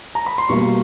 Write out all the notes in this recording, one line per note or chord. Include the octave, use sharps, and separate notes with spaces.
A#5
B5
C6
B2 G3 A#3 C#6